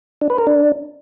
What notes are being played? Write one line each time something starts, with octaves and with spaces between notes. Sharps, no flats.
D4
B4
A#4
D4